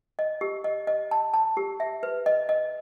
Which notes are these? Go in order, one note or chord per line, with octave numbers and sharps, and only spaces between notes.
D#5
G4
D#5
D#5
A5
A5
G4
E5
B4
D#5
D#5